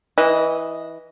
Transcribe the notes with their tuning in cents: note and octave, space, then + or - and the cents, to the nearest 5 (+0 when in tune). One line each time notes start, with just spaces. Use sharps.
E3 -15 D#5 +0